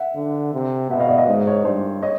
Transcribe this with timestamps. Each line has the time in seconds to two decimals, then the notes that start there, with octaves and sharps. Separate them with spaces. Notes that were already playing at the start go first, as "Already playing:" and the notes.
Already playing: E5 F#5
0.15 D3
0.54 C3
0.90 B2 E5 F#5
1.00 D#5 F5
1.09 D5 E5
1.18 D#5 F5
1.27 G#2
1.47 C#5 D#5
1.65 G2 C5 D5
2.02 C#5 D#5